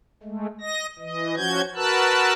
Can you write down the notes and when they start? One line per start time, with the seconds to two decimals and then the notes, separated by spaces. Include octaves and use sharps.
0.23 G#3 A3
0.61 D#5 A#6
0.99 E3 D#5
1.36 F3 C#4 F#4 G6 G#6
1.75 F#4 A#4 B4 A5 E6 F#6